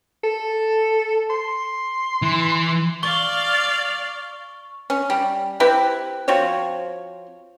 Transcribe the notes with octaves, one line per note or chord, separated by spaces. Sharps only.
A4
C6
E3
D5 F5 C#6 G7
C#4
G3
C4 E4 G4 B4
F3 C4 F#4 C#5